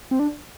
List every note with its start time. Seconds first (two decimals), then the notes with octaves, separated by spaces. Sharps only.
0.11 C4
0.19 D4